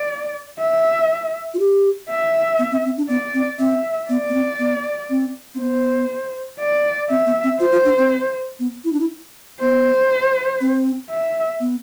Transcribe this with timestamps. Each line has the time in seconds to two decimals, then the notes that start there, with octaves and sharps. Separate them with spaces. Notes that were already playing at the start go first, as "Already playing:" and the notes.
Already playing: D5
0.59 E5
1.54 F4
1.59 G4
2.10 E5
2.59 B3
2.72 C4
2.85 C4
2.97 D4
3.09 B3 D5
3.34 C4
3.59 C4 E5
4.09 B3 D5
4.29 B3
4.34 C4
4.59 B3
5.10 C4
5.55 C4
5.59 B3 C5
6.59 D5
7.10 C4 E5
7.26 B3
7.43 C4
7.59 F4 C5
7.72 F4
7.85 D4
7.98 C4
8.60 B3
8.85 E4
8.92 D4
9.00 E4
9.60 B3 C5
10.61 C4
11.10 E5
11.60 B3